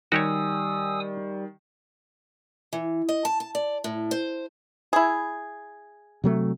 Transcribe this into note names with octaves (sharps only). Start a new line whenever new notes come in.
D#3 G3 F#4 G4 C#5 G#5 D#6 E6
E3
D#5
A5
A5
D5
A2
C5
E4 G#4
C3 F#3 A3